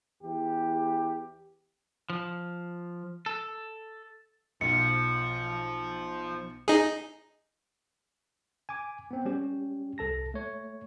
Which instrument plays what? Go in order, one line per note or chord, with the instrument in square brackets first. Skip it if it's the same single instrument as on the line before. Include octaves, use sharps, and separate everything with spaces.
[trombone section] E2 E3 G4
[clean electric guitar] F3
A4
[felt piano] B1 [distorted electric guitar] F3 [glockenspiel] C#7
[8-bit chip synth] D#4 G#4
[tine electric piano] G#5 D6
B3 C4
G3 C#4 G4
C2 A4 A5 A#6
A3 C#5